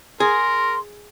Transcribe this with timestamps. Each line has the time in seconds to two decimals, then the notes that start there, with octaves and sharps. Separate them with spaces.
0.20 G#4 A#4 C6